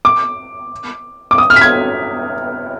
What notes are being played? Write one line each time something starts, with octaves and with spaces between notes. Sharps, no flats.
D6
D6
D#6
F6
B6
G#6